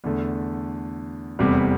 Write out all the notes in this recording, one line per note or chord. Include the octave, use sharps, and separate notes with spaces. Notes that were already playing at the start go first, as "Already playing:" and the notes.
E2 D3 A3
F1 E2 C3 G3